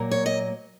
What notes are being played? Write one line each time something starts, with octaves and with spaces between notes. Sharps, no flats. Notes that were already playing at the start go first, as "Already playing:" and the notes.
Already playing: A#2 F#3 A#3
C#5
D#5